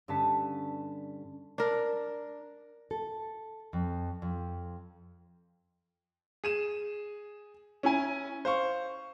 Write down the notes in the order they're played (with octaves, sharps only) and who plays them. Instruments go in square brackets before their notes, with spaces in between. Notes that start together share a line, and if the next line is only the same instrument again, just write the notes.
[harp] G2 D3 C#4 C#5 A5 B6
[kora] D4 A#4
[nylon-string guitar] A4
F2
F2
[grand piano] G#4 D#7 E7
C#4 E4 G#5
C5 F5 C#6